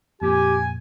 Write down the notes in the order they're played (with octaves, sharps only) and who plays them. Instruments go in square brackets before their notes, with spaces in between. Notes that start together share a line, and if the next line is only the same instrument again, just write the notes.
[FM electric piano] F2 A#2 [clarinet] G4 [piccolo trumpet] G#5